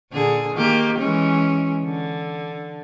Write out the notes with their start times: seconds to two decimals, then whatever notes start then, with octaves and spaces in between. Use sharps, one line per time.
0.12 A#2 D3 G#4
0.55 D#3 A#3 G4
0.99 E3 G#3 C#4
1.85 D3